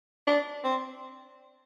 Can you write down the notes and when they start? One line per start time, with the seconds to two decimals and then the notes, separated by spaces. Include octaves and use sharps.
0.27 D4
0.64 C4